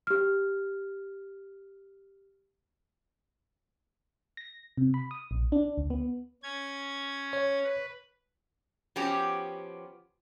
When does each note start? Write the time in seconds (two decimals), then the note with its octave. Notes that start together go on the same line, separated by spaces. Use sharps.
0.07 G4 F6
4.37 A#6
4.77 C3
4.94 B5
5.11 D#6
5.31 A#1
5.52 D4
5.78 D2
5.90 B3
6.43 C#4 G#6
7.33 C#5
7.64 B4
8.96 F3 B3 C#4 F#4 G4